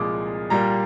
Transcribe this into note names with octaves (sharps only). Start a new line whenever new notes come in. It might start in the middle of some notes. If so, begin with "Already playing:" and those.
Already playing: C2 A#2 F3 G#3 D6 D#6
A#2 G3 A#3 A#5